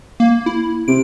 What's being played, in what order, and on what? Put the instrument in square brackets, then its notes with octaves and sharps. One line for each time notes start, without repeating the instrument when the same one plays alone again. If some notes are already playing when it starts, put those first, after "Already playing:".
[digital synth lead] A#3
E4
[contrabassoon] C3 [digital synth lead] D7